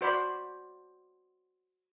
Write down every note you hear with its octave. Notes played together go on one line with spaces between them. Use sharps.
F#4 C5 D5 B5